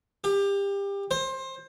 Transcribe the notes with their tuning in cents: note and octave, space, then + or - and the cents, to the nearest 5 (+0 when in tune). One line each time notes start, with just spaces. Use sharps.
G4 +25
C5 +20